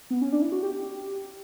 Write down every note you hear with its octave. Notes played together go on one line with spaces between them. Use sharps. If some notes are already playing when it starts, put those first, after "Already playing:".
B3
C#4
D4
E4
F#4
G4
G4